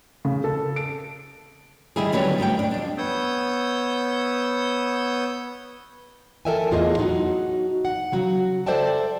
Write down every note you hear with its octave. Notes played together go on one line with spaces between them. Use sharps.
C#3
A4
D7
D3 D#3 G3 E4 G4 G#4
D3 F#3 G3 B3 C#4 B4
D2 G2 B3 G5
D4
F2 D4
B3 C#5 D#6 E6 G6
A4 A#4 C#5 E5 G5 G#5
E2 A2 F4 G#4 D#5
F#3 D#4 F#4
F#5
C#3 F#3 F#4
A4 C5 D5 E5 G5 A5